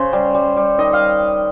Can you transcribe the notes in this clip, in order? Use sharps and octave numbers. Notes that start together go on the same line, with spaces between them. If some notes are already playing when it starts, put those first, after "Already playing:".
Already playing: C#3 C5
G3
G3
G3
D#3 D#5
F5